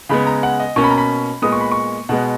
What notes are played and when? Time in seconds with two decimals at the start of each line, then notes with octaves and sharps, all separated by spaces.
0.09 C#3 G#3 B3 B5
0.27 A#5
0.43 F#5
0.60 D#5
0.76 B2 A#3 C#4 C#6
0.84 B5
0.91 A#5
0.98 B5
1.42 A#2 G#3 B3 D#6
1.52 C#6
1.61 B5
1.72 C#6
2.09 B2 G#3 B3 F#5